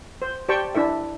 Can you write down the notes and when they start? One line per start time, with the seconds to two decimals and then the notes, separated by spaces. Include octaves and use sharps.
0.22 C5
0.49 G4 C5 D5 G5 A5 C#6
0.75 D4 E4 A4 E5